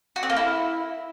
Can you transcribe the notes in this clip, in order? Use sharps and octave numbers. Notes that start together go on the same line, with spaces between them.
F#4
C4
A#3
E4